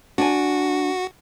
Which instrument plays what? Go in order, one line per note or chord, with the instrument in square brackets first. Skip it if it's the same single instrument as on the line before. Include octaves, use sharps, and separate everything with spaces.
[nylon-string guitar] D4 G#5 [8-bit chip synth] F#4